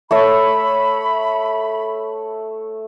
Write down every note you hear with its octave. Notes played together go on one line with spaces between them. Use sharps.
A3 C#5 E5 B5